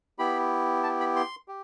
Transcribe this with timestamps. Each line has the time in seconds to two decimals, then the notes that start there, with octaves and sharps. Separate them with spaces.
0.19 B3 E4 G4 B5
0.83 A5
1.00 B5
1.16 C6
1.48 G4